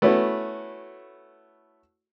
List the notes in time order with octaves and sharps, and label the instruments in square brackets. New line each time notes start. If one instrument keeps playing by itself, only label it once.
[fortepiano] A3 B3 C#4 E4 F#4